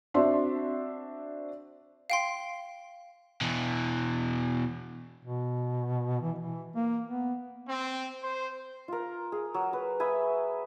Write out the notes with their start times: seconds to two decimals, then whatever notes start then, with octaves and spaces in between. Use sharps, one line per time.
0.14 C4 D4 F#4 E5 C6
2.10 F5 G5 C6
3.41 B2 E3
5.25 B2
6.21 E3
6.39 E3
6.76 A#3
7.07 B3
7.67 C4
8.22 C5
8.88 F4 A#4
9.32 G#4
9.54 F#3
9.73 B4
10.00 E5 G#5 B5 D#6